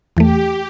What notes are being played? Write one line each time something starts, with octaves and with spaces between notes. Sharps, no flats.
E2 E3 A3 G4